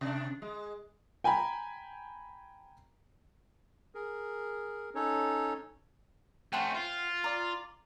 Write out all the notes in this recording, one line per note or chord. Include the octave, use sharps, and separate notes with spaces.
C3 D4
G#3
G5 G#5 A#5 B5
G#4 A#4
C#4 D#4 A4 C#5
A3 C#4 C5 F#5 G5
F4
D5 A#5